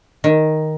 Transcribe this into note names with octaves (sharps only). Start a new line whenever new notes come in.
D#3